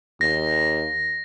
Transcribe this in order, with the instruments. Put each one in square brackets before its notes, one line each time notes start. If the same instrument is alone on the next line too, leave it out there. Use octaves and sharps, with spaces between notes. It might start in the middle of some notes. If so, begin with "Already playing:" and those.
[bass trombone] D#2 [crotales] A#6